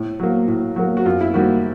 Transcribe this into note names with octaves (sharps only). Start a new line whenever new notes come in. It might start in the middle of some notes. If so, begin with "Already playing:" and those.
Already playing: A2
F#3 A#3
A2
F#3 A#3
F#4
F#2 F4
E4
D#3 G3 A#3 F#4